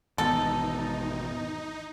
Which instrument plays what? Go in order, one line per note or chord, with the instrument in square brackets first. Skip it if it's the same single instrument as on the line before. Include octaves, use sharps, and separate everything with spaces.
[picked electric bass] G#1 E2 B2 [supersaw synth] D#4 [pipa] A4